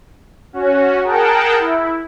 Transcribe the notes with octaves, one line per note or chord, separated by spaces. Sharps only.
C#4 F#4
G#4 A#4 F#5 G5 A5
E4